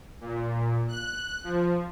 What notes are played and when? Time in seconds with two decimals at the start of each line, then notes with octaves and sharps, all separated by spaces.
0.21 A#2
0.88 F#6
1.44 F3